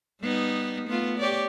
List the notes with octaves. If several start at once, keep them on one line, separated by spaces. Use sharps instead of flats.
G3 B3 D#4
A3 B3 F4
G4 C#5 D5